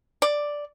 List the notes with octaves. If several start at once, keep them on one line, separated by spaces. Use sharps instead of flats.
D5